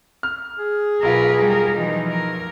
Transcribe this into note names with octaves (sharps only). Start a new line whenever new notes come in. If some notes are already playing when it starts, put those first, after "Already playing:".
F6
G#4
B1 F4 A#4 B4
G3 A#4
E3 F3 D#4
A#4